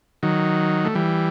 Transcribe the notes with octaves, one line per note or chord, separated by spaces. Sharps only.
D#3 F#3
A3
E3 G3